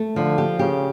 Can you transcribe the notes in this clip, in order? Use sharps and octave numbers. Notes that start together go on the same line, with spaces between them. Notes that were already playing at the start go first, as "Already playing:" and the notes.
Already playing: A3
D3 F3
G4
C#3 G4